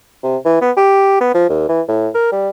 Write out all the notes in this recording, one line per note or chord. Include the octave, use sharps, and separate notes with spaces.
C3
E3
B3
G4
B3
F3
D#2
E3
A2
A#4
G3